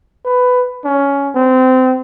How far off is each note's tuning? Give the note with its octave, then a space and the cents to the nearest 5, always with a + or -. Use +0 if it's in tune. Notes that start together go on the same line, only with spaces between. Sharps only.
B4 +15
C#4 +15
C4 -25